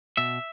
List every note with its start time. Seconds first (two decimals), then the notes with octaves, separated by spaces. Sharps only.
0.17 B2 E5